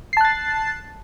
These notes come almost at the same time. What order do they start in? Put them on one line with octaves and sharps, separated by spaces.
C7 A5 F#6 A6